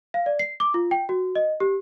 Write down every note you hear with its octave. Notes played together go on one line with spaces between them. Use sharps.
F5
D5
C7
D6
F4
G5
F#4
D#5
G4